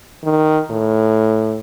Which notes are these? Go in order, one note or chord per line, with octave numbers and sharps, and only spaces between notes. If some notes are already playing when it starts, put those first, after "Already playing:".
D#3
A2